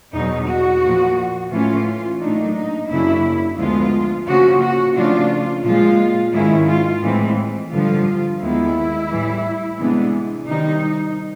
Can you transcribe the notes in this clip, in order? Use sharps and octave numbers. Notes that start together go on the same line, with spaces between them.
E2 B2 F#3 D#4
F#4
A#2 F3 A#3
A2 E3 A3 C#4 F4
A#2 F#3 A3 D4 D#4
D#4
F#2 C#3 F#3 A#3 D4 E4
D2 D3 F3 G#3 B3 F4
C#3 F3 A#3 C#4 F#4
F#4
C#3 F3 A3 D4 F4
A#2 F3 G#3 F4
G#2 D#3 G#3 C#4 E4
F4
A2 E3 G#3 C4
G2 D3 F3 F4
D#2 D#3 G#3 B3 E4
A2 E3 G3
C3 E3 G#3 B3 D4
C3 D#3 G3 D#4